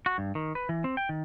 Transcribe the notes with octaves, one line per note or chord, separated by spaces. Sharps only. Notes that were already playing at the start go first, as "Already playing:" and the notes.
F#4
G2
D#3
B4
E3
C4
G5
D#3